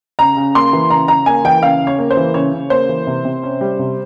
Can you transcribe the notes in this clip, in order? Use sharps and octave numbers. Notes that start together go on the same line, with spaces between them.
C#3 A#5
C#3
A#3 C6
E3
C#3 A#5
C#3 A#5
A#3 G#5
E3 G5
C#3 F5
C#3
C#5
A#3
C5
E3
C#3 C#5
C#3
A#3 C5
E3
C3
C3
C#4
G3
C3